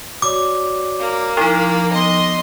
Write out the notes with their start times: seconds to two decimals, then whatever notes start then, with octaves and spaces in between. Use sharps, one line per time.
0.22 F#4 C#5 D5 D6
1.00 A#3
1.37 F3 D#4 E4
1.93 B3 D#5 C6